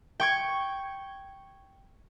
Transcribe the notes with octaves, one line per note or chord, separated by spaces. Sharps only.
G5 C#6 G#6